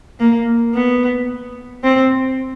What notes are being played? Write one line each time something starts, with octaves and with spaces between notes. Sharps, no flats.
A#3
B3
C4